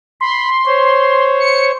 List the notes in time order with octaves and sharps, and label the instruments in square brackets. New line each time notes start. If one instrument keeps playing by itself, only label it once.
[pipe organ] B5 [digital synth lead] C6
[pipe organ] C5 C#5
[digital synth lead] C#7